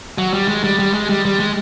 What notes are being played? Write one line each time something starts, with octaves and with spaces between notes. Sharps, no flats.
F#3
G3
G#3
G3
G3
G#3
G3
G3
G#3